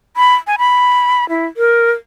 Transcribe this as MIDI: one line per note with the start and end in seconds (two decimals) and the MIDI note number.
0.17 0.35 83
0.47 0.56 80
0.58 1.28 83
1.29 1.46 64
1.57 1.90 70